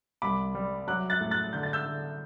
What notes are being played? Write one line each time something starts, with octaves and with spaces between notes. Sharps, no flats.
C2 B5 D6
G3
F#3 D6 F#6
F#6 A6
A2
F#6 A6
D3 G6
A6
E6 G6
D3